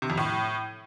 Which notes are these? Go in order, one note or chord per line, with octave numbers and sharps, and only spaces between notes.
C3
F2
A2